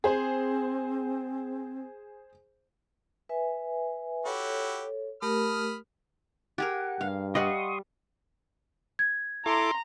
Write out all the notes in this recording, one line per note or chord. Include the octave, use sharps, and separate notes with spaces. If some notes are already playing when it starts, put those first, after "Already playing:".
C4 G#4 C5
B4 E5 G#5
E4 F#4 G4 A4 C#5
A3 G4 A#4 B5 D#6 F6
G4 G#4 A#4 F#5
G2 F5
G3 D#5 F5 F#5 C6 C#6 D#6
G#6
E4 A4 A#5 C6 D6